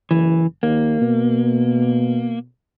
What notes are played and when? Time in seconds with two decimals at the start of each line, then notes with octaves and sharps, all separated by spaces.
0.11 F#1 E3
0.63 D#2 A#3
1.01 B2